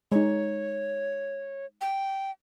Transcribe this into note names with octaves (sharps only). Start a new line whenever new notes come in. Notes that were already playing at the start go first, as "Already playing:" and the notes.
G#3 D#4 C#5
G5